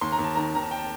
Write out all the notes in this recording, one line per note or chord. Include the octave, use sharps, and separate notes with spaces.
D#2 C6
A#5
D#2
A5
D#3 A#5
D#3 A#5
A5
G5
A5